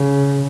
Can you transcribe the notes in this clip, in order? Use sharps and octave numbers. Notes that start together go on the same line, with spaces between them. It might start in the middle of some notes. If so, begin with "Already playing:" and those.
Already playing: C#3